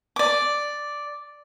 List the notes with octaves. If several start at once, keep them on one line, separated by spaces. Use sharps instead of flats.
D5 D6